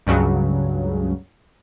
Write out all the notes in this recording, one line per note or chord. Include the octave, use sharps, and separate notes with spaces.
C#2 G2 C#3 F#3